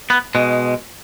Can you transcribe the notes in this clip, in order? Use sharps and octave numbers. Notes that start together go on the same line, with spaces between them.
B3
B2 G#3